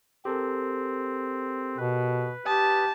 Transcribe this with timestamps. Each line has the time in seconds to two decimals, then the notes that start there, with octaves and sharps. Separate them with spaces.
0.25 C4 G4 A4 A#4
1.78 B2 B4
2.46 G4 A5 D#6